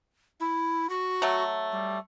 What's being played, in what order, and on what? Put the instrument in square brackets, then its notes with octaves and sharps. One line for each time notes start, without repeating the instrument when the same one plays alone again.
[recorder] E4
F#4
[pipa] F#3 A3
[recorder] G3